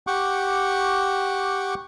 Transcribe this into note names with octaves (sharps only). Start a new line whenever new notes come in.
G4 F#5 C#6 D6